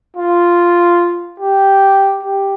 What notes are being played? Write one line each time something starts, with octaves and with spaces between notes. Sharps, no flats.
F4
G4
G4